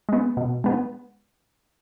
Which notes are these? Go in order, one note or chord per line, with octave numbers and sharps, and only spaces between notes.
G#3 B3
B2
G#3 B3